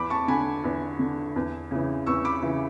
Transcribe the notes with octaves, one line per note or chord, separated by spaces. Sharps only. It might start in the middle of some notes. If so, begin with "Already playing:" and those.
Already playing: E2 B5 D6
A5 C#6
D3 G#5 B5
E2
D3
E2
C#3 E3
E2 C#6 E6
B5 D6
C#3 E3